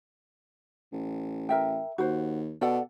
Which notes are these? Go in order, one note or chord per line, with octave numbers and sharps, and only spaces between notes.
A1
A#4 E5 G5
D#2 F#4 C5
B2 A4 D5 F#5